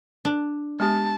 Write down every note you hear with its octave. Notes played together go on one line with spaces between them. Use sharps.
D4
G#3 B3 G4 A5